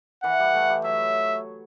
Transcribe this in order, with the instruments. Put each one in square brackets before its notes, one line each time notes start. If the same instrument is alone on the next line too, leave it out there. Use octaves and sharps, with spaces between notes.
[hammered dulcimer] E3 [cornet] F#5
[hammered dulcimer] G3
A3
G3
[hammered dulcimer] F#3 [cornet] E5